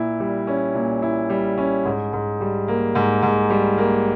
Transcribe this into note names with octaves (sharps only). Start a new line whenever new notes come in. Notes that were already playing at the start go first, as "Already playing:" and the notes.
Already playing: A#2 E4
G3
C#4
A#2
E4
G3
C#4
G#2
G#2
G3
A#3
G#2
G#2
G3
A#3